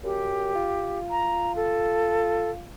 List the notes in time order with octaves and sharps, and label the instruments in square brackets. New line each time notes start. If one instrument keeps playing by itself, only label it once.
[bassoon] F#2 [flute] G4
[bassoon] F4
[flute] A#5
A4